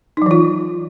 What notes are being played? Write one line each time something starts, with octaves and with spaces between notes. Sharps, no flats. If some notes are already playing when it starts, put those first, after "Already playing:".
E3 F#3 D#4 F4